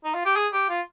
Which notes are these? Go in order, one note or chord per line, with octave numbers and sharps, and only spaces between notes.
D#4
F4
G4
G#4
G4
F4